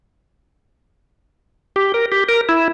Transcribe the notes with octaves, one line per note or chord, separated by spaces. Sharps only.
G4
A#4
G4
A#4
E4